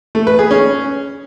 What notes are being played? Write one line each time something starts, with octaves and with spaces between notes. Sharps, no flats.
A3
B4
G#4
C#4